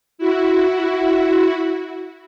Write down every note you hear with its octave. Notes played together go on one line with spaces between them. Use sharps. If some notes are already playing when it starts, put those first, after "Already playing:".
E4 F#4